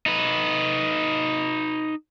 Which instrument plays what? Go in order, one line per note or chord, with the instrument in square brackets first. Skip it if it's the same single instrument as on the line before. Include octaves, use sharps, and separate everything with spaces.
[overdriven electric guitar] D#4 B4